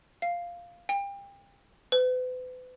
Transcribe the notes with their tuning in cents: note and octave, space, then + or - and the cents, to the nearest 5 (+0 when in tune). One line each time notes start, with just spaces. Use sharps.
F5 -5
G5 +30
B4 +40